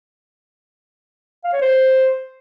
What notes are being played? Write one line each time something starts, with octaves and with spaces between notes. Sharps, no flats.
F5
C#5
C5